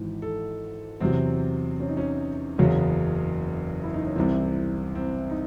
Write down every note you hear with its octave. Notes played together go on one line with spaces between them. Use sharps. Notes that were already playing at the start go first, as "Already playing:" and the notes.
Already playing: G#1 G#2 E3
A4
E2 C3 F#3 C4
C#4
D#4
C#4
F#1 E2 C#3 F#3 C#4
E4
D#4
C#4
C2 C3 E3 C4
C4
D#4